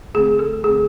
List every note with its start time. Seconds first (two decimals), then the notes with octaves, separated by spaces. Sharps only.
0.14 D3 A3 C4 G#4
0.39 A4
0.64 D3 A3 C4 G#4